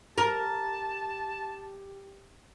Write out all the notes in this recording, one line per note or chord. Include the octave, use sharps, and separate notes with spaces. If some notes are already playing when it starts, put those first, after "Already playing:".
G4 A#4 A5